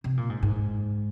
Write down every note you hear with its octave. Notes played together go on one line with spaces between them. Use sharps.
C3
A#2
G#2
G#2